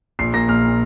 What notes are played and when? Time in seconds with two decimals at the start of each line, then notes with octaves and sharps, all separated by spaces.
0.19 A#1 C7
0.34 A#2 A#3 A#6
0.48 A#1 F6
0.64 A#2 A#3